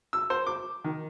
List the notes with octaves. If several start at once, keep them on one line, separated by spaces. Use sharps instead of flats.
E6
C5
D6
D#3